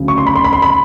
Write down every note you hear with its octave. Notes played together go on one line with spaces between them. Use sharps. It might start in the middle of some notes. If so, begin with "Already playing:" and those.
Already playing: D2 C#3 F#3
C#6
C6
B5
C6
B5
C6
B5